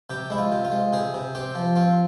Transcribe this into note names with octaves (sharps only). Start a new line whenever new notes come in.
C3 G4
G#3 E4
F4
C3
F4
G#3
C3 G#4
C3
C4 G4
F3
C4 F4